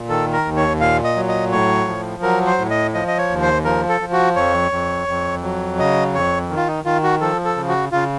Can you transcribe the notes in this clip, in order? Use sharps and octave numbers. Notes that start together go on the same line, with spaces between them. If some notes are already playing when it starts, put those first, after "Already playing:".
Already playing: A#2
D#3 A4
A#4
D#2
C#5
A#2 F5
D#5
F#3
D#5
A2 C#5
F3
F#3 A#4
C5
A2
D#5
F3 D#5
D#5
C#5
D#2
C5
F3 A#4
A4
F3
F#4
F2 C#5
F2
F2
F#3
C#3 D#5
F2 C#5
D#3
F4
D#4
D#3 F4
F#4
F3 A4
A4
C#3
F#4
C#3 F4